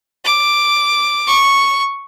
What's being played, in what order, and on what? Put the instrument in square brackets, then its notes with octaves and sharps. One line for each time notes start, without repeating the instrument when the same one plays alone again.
[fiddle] D6
C#6